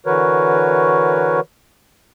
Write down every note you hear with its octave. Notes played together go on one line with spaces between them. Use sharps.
D3 E3 F#4 A#4 B4 C#5